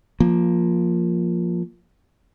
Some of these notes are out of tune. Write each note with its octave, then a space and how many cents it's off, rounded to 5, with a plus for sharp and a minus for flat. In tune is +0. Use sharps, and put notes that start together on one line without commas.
F3 +0 A#3 +5